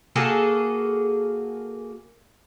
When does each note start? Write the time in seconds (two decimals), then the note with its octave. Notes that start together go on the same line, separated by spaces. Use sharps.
0.16 A#3 F#4 G#4 A4